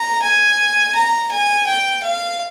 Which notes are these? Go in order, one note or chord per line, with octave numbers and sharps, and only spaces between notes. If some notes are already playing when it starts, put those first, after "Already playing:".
Already playing: A#5
G#5
A#5
G#5
G5
F5